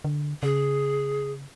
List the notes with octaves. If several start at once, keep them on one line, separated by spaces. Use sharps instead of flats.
D3
C#3 G#4